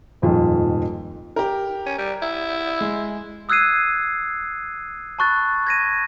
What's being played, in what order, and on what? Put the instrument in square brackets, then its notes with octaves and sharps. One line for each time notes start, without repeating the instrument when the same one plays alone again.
[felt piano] D#1 F2 G#2 F4
[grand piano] G4 A#4
[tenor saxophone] C#4
G3
E4
[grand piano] G#3
[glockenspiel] D#6 E6 F#6 G#6 C7 D#7
A5 B5 C#6 F#6 A6
G#6 A#6 D#7